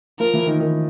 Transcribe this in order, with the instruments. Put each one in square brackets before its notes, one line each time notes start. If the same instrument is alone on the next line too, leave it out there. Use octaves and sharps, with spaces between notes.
[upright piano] F3 F4 [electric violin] A#4
[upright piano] E3 E4
D#3 D#4
D#3 D#4